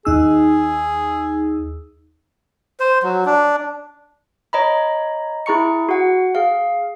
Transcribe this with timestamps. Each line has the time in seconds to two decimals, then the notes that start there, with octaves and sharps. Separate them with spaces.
0.05 D#2 D#4 G#4 E6
2.80 C5
3.03 F#3
3.26 D4
4.53 C#5 D#5 A#5 B5
5.46 E4 G#4 A#5 C#6 C#7
5.89 F#4 F#5
6.35 G#4 F5